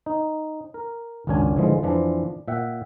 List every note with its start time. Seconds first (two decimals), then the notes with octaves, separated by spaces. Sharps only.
0.06 D#4
0.74 A#4
1.27 G#1 C#2 F#2 C#4 D4 G#5
1.56 G#2 D3 E3 F3 G#3
1.83 F2 E3 F3 D4
2.48 A#2 E5 F#5 G5